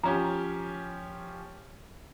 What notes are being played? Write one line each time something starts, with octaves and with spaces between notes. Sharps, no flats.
F3 C#4 G4 A#5